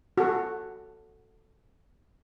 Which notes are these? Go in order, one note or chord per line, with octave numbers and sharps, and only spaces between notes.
F#4 A4